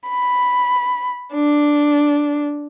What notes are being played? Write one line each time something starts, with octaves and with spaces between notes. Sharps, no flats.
B5
D4